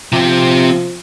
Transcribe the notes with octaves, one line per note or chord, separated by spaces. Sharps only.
C3 F3 C4